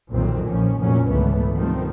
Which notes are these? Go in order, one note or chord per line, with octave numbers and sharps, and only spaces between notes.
B1 F2 A#2 D#3 F#3 C4
A#1 F3 C#4
F1 D2 A#2 F#3 C#4
C#2 G#2 D3 E3 A3 B3
B2 D#3 F3 G3 A3 C4